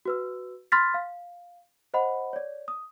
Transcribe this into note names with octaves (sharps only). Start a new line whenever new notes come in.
F#4 B4 E6
B5 C6 F6 A6 B6
F5
C5 D#5 F#5 B5
C#5 D5
D#6